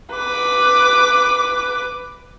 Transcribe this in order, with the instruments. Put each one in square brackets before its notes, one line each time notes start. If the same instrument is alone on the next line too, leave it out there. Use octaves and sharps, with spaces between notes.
[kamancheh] B4 D6